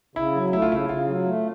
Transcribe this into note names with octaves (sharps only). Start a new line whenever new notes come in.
C#3 E4
F#3
A3 E4
F4
C#3 E4
C#3 F4
F#3
A3